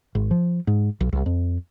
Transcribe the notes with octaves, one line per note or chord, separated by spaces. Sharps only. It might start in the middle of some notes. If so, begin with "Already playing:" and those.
G#1
F3
G#2
B1
C2
F2